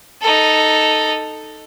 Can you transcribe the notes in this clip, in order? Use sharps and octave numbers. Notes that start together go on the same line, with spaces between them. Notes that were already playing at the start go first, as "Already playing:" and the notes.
D#4 A4